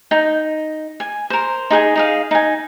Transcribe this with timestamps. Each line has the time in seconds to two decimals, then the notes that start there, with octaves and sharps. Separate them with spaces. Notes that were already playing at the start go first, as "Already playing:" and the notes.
0.11 D#4 G5
1.00 G#5
1.30 A#4 C5
1.70 D#4 G#4 F#5 G#5
1.96 D#4 G#4 F5
2.31 D#4 G#5